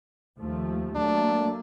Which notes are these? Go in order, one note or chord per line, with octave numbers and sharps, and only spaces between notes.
D#2 F3 A3
F#3 A3 A#3 D4